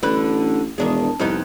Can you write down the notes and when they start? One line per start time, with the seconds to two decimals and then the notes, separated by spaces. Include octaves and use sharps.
0.03 A1 D3 B4
0.78 E1 D#3 D4 G#4
1.20 C2 F2 B3 D#4